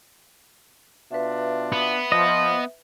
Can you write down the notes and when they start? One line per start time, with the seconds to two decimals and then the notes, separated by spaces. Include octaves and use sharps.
1.11 B2 D4 F4 B4 E5
1.72 B3
2.12 F3 D#5